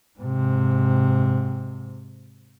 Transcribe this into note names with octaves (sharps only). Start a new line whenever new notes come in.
G#2 C3